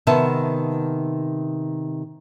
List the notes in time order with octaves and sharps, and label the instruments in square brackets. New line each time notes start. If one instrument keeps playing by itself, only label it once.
[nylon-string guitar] C3 D#3 B3 E5 A5